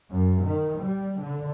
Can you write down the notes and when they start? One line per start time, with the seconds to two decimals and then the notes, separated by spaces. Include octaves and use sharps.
0.12 F#2
0.43 D#3
0.81 G3
1.19 D3